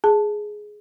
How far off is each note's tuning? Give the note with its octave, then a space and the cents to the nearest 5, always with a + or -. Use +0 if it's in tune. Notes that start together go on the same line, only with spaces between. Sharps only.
G#4 +10 A5 +0